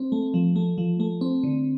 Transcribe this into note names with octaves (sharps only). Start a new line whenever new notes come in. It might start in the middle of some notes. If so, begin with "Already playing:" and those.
Already playing: C4
A3
F3
A3
F3
A3
C4
D3